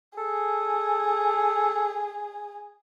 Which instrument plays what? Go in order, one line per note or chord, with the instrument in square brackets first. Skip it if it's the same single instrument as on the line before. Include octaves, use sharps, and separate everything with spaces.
[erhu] G#4 [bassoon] A4